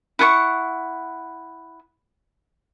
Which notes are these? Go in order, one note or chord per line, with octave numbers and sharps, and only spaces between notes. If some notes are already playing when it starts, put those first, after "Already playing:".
E4 F#5 G#5 C#6